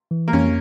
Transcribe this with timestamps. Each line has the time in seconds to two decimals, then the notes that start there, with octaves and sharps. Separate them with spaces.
0.11 E3
0.28 A#3
0.33 F2 C#4